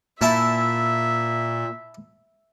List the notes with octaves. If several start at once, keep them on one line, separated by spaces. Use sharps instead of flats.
A#2 E4 E5 A5